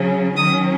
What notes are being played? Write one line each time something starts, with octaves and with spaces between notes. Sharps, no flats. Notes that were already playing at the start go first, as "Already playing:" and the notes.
Already playing: C#3 F#3 C#4
D#3 F#3 C#4 D#6